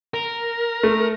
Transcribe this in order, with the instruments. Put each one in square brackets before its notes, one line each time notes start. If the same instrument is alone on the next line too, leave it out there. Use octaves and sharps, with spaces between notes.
[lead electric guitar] A#4
[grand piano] A3